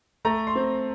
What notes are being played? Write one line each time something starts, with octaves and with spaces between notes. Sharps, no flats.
A3 A#5
C6
C4